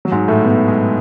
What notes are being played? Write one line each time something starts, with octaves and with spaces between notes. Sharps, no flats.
F#3
G#2 G#3
A2 A3
B2 B3
G#3 G#4